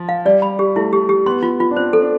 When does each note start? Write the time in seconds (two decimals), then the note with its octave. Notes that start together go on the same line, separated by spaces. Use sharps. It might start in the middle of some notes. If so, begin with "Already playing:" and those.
Already playing: F3
0.09 F5
0.25 G3 D5
0.42 B5
0.59 G4
0.76 A3 E4
0.93 G4
1.09 G4
1.26 B3 C6
1.43 F4
1.60 F4
1.71 D4
1.76 C4 C5
1.93 A4
2.02 D4